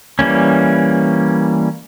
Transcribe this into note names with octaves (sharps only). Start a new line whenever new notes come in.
E3 G3 A#3 C#4